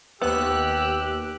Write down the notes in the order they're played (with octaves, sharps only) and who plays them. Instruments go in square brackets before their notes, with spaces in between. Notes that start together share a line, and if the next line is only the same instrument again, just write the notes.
[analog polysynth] D#2 F#6 [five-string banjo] B3 [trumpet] G4 [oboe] E6